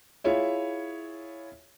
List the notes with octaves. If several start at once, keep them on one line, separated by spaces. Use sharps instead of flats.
E4 F4 G#4 C#5 E5